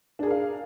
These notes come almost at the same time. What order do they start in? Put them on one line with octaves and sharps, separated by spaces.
D4 G#4 A#4 F5